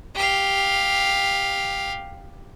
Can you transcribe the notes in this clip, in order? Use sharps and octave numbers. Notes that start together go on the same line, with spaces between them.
G4 F5